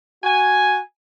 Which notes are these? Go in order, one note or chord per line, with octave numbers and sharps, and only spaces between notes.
F#4 G#5